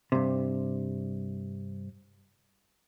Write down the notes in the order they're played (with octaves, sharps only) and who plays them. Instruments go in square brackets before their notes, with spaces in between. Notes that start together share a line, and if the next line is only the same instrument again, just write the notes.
[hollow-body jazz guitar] G2 C3